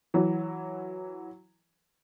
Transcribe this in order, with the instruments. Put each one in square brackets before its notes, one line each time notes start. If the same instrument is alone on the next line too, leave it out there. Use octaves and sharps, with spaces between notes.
[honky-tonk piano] E3 F#3